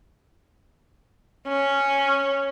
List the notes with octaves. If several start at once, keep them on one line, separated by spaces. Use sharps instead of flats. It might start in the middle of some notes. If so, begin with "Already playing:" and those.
C#4